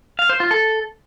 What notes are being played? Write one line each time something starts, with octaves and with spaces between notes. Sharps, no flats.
F5
C5
F4
A4